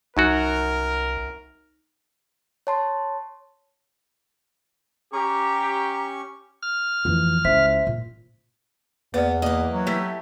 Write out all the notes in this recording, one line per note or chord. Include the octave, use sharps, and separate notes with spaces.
C2 F#2 F#3 D#4 F#4 A#4
C#5 A5 C6
C#4 G4 A#5 C#6
F6
F2 E3 F3 A3 F4
C#2 E4 C5 E5 B6
A#2
E2 A#3 B3 B4 D5
E3 A#3 D#5
F#3
A3 E4 G4